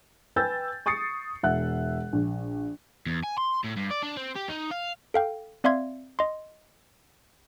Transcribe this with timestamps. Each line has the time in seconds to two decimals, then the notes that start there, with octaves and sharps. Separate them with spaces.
0.36 B4 G5 G#5 E6 G6 A6
0.86 C#6 D#6 A6 C7 C#7
1.43 E1 E5 F#5 F#6
2.13 A#1
3.06 E2
3.23 G#5
3.38 C6
3.64 A2
3.76 G2
3.90 D5
4.03 D4
4.17 C4
4.36 G4
4.49 D#4
4.71 F5
5.14 A4 F5 G5
5.64 C4 D5 E5 F5 C6 G#6
6.19 D#5 C6